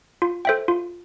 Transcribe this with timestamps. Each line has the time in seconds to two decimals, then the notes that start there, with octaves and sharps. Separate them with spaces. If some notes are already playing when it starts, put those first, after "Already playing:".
0.22 F4
0.45 A4 C5 E5 G5
0.68 F4